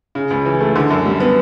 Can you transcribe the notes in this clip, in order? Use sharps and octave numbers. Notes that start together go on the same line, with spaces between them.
C#3
C#2
E3
A3
D3
F#2
G3
B3